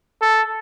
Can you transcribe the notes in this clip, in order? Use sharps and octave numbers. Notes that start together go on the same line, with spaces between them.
A4